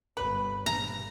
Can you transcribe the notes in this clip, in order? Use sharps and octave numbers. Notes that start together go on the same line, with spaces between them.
G1 B4
G1 A#2 A#5